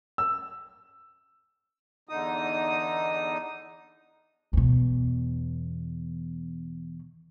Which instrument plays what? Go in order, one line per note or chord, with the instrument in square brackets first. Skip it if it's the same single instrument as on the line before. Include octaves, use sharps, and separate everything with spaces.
[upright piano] E6
[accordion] E2 D3 D#4 D#6
[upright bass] E2 B2